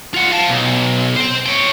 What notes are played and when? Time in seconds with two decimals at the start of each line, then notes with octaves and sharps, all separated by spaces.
0.14 F4 F#5
0.32 F5 A5
0.49 B1
1.17 C5 G5
1.46 C#5 G5